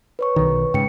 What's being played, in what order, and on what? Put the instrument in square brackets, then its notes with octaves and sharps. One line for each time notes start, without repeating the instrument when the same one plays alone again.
[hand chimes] B4 C#5 C#6
[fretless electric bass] B1 D#3
[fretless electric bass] G#2 C#3 [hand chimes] G5 C#7